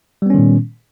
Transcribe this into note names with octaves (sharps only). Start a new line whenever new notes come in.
A#2 D#3 G3 B3 C#4